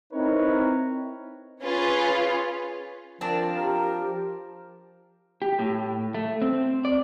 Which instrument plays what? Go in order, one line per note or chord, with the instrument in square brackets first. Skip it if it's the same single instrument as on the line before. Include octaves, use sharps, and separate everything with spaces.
[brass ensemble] C4 D#4 E4 A#4 B4 C#5
[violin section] C#4 F4 G#4 B4
[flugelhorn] F3 [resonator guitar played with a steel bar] C4 D4 [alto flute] A#4 [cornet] A5
[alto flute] G4 [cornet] A#4
[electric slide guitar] G4
A2
A3
C4
D5